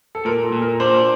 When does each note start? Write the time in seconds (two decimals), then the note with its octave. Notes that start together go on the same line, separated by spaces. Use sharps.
0.15 A4
0.25 A#2 A#4
0.43 A4
0.52 A#2
0.62 A#4
0.80 D4 C5